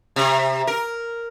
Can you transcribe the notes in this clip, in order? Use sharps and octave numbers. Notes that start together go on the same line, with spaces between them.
C3
A#4